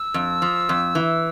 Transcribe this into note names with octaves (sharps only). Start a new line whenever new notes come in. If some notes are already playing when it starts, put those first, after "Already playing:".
Already playing: E6
F2
F3
F2
E3